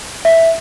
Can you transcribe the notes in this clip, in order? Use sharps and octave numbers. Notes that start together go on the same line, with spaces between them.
E5